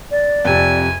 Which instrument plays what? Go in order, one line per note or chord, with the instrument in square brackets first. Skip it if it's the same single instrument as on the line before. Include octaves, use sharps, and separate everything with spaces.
[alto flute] D5
[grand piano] F2 C3 [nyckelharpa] G#5